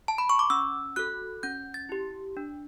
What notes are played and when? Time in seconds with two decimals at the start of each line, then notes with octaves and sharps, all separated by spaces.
0.08 A5
0.18 B5
0.29 C#6
0.39 D6
0.50 C#4 E6
0.96 F#4 A4 F#6
1.43 C#4 G6
1.74 A6
1.89 E4 G4
2.37 D4